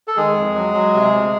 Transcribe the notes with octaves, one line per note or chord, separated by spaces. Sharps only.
A4
D#3 G#3 G#4
F2
F#3
F#3
C3
D2